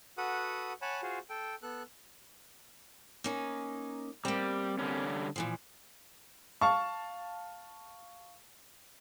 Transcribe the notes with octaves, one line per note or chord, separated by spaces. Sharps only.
F#4 A4 B4 F#5 D#6
C#5 F#5 G#5 A5 B5
F4 F#4 G#4 C5
A4 G5
B3 A4 F#6
A#3 C#4 D#4
G3 A#3 C4
D3 G3 C#4
A#2 E3 F3
F5 A5 C#6